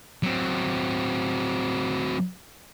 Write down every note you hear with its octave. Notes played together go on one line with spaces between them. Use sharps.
F#3 C4